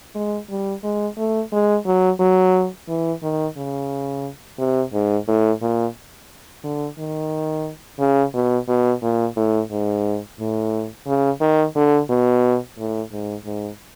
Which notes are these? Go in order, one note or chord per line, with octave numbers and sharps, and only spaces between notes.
G#3
G3
G#3
A3
G#3
F#3
F#3
E3
D#3
C#3
C3
G#2
A2
A#2
D3
D#3
C#3
B2
B2
A#2
A2
G#2
A2
C#3
D#3
D3
B2
A2
G#2
G#2